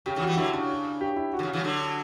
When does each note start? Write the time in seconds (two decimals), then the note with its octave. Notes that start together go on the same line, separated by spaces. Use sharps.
0.06 C#3 G4
0.16 C#3 E3
0.22 F#4
0.27 E3 G3
0.32 F#4
0.37 D3 F#3 E4
0.53 C#3 D4
1.01 G4
1.16 E4
1.33 F#4
1.39 D3
1.43 C#3
1.53 C#3 E3
1.59 G3
1.64 D3 F#3